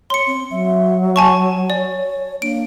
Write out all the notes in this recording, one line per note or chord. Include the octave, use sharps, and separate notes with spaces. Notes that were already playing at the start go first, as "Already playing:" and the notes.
C#5 C6 C#7
C4
F#3 E5
C#5 G#5 A5 C#6
D5
A#3 D4 D7